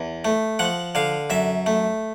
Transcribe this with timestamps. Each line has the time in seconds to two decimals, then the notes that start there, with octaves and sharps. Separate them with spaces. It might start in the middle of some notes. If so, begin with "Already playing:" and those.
Already playing: E2
0.25 A3
0.59 F3 F#5
0.95 D3 F5
1.30 F#2 E5
1.66 A3